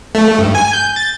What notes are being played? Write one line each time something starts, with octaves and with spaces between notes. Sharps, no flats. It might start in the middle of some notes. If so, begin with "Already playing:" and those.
A3
G2
G#5
G6
A6